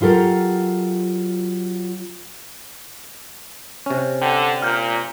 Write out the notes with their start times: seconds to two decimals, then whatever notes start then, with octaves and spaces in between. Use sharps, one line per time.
0.01 F#3 F4 G4 A4 A#4
3.86 C3 C#4
4.22 D3 G5
4.62 A#2 F6 G6